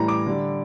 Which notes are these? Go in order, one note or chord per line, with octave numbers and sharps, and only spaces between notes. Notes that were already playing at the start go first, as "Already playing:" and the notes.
Already playing: A2 E3 G3 A#5
D6
D3 G3